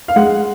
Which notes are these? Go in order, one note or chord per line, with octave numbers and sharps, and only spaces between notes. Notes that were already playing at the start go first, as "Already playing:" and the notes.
F5
G#3 F#5